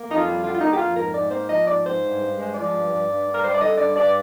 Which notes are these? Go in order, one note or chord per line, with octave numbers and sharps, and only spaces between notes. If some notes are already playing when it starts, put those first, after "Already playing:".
Already playing: A#3
F2 D#4
F4
G3
D3 F4
F4
A#3 D#4
G4
F2 F4
G#2 A#4
G#2 D5
A#3 C5
F3 D#5
G#2 D5
G#2 C5
G2
G2
G#3
C5
F3 D5
G2
G2
G2
G2
A#4
G3 C5
D5
D3 D#5
G2 D5
G2 D5